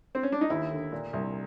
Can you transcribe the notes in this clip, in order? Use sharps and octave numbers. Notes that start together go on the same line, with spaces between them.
C4
C#4
D4
D#4
D#2 E4
D3
A#2
C2